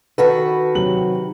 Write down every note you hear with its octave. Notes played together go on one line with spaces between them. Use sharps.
D#3 F#4 A4 B4
C3 F#3 F#7